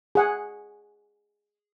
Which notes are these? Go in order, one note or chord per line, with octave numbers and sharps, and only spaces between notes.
G#4 F#5 G#5